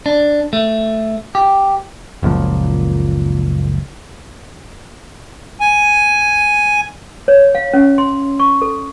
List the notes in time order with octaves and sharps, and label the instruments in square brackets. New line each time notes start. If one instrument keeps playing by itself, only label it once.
[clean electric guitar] D4
A3
G4
[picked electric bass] F#1 C#2 A#2 F3
[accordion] G#5
[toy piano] C#5
F5
C#4
C6
C#6
A4